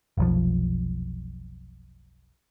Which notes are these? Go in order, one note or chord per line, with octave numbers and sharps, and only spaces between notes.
F1 B1 F3